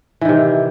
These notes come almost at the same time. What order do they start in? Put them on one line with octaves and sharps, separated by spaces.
E3 D#3 C3